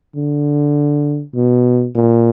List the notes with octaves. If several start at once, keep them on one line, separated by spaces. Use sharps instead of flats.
D3
B2
A#2